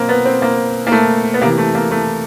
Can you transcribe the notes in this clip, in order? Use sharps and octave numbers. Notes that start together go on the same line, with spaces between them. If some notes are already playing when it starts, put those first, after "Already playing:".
Already playing: B2 F#3 A#3 C4
B3
C4
A#3
A#3
A3
B3
C3 E3 A#3
A3
A#3
A3